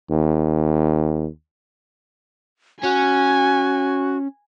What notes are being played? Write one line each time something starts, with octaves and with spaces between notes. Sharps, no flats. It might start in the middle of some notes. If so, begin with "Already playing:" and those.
D#2
C#4 F#4 G#5